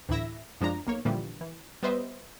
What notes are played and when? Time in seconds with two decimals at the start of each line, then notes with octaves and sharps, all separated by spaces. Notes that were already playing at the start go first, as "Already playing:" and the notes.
0.09 D2 A2 E3 E4 E5 A#6
0.61 F#2 F3 G#3 D4 A#5
0.86 B1 A#3 C#5
1.05 A#2 D3 E3 F3 G3
1.41 E3
1.83 G3 B3 B4 C5 D#5 E5